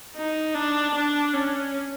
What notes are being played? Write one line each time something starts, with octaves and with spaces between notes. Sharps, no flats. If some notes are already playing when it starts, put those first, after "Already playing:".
D#4
D4
D4
C#4